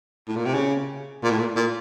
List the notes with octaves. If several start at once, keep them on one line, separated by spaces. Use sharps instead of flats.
A2
A#2
C3
C#3
A#2
A2
A#2
A#2